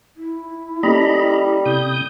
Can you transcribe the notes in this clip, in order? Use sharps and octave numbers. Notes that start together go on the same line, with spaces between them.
E4
G3 A#3 C#4 A4 D#5 A#5 B5
C3 D#6 G6